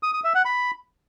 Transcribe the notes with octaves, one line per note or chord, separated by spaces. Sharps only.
D#6
D#6
E5
F#5
B5